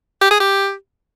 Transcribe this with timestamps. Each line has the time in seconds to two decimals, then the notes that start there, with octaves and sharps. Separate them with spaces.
0.21 G4
0.31 G#4
0.40 G4